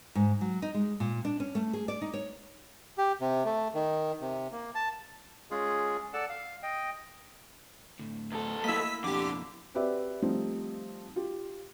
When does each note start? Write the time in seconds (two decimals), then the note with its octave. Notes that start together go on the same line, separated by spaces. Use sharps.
0.15 G#2
0.41 F#3
0.62 D#4
0.74 G#3
1.00 A#2
1.25 D4
1.40 C#4
1.55 A3
1.73 G#4
1.88 D5
2.02 D#4
2.13 C#5
2.98 G4
3.21 C3
3.45 A3
3.75 D#3
4.21 C3
4.52 A#3
4.75 A5
5.51 G#3 C#4 F4 G#4
6.14 A4 D5 F#5 A5
6.29 F5
6.63 D#5 G5
7.99 D2 A2
8.32 E2 A4
8.64 A#3 E4 D#5 E6 B6
9.04 F2 B2 D3 G4 D6
9.74 C4 F#4 G4 B4 D5 E5
10.22 F3 G3 A3 C4 D#4
11.16 F4 G4